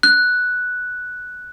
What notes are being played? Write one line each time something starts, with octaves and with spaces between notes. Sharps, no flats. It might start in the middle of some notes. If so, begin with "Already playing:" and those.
F#6